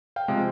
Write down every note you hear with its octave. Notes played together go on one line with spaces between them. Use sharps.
F5 G5
C3 F3 G#3